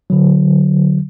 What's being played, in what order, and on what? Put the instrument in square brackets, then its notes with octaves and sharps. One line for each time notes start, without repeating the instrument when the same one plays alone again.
[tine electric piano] D3 F#3